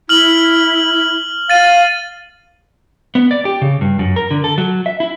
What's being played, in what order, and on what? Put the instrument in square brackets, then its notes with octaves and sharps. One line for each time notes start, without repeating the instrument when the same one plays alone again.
[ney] E4 [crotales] F6 F#7
[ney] F5 [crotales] A6 D#7
[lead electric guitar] B3
D5
G4
C#3
G2
F#2
A#4
D3
A4
F#3
E5
E4